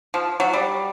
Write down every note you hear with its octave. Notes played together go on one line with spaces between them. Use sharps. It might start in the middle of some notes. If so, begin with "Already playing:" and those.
F3
F#3
G3